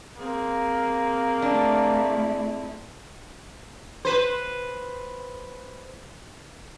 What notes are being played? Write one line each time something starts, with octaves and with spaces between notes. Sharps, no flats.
A#3 C4 G#4
A3 D4 E4
B4 C5